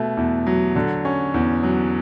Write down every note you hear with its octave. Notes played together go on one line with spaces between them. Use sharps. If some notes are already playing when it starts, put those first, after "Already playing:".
Already playing: B2 A3
E2
F#3
D3
C#4
E2
F#3